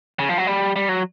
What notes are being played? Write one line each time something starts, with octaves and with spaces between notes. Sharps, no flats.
C#3
F3
F#3
G3
G3
F#3